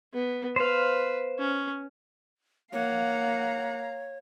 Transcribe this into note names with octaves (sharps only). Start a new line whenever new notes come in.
B3
B4 C5 F5
C#4
A#3 C#5 F5 F#5 A#5